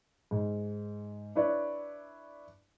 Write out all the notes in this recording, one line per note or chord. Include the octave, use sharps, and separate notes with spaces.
G#2
D4 E4 B4 C#5 D5